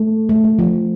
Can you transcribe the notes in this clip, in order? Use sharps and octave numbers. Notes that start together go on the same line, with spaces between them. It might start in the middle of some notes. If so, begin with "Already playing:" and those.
Already playing: A3
A3
A3
F3